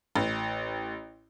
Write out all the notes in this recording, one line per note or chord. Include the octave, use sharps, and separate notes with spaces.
A1